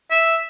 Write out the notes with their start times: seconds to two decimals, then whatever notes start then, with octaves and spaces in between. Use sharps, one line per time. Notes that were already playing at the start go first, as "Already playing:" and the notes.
0.11 E5